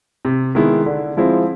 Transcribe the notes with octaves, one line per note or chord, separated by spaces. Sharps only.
C3
D#3 G#3 B3 E4
D3
F3 G#3 C4 E4